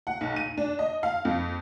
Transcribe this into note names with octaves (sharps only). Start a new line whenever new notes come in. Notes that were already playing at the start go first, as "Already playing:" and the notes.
F#5
B1
D#7
D4
D#5
F5
F2